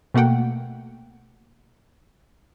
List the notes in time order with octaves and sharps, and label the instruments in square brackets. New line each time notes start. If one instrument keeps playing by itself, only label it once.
[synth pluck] B2 A3 A#3 F#5 G5